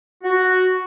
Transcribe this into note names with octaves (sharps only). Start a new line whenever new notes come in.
F#4